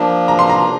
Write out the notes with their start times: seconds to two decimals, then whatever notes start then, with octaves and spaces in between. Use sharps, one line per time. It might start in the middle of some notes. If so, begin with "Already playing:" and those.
Already playing: F3 A#3 D4
0.28 A#5
0.39 C6
0.49 A#5